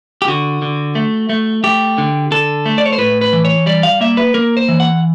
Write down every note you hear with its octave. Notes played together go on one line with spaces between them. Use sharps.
G4
D3 F#4
D3
A3
A3
A3 G4
D3
D3 A4
A3
D5
C#5
C5
A2 B4
B4
E3
C#5
G3 D5
F5
A#3 E5
B4
A#3 A#4
C5
E3
F#5